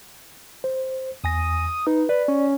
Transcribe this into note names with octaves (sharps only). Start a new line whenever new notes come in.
C5
E2 G#5 D#6 A#6
D#4 B4
B4 D5
C#4